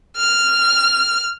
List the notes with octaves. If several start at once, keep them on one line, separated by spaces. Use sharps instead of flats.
F6